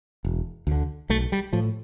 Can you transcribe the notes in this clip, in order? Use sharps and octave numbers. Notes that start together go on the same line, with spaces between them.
E1
D2 D3
B1 A3
G3
A2 F3